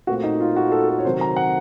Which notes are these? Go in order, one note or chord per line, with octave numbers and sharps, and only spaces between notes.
A#2 A3 C4 F#4
D#4
F4
F#4
A4
A4
C#5
C3 D#3 F#3 C5
A#5
F#5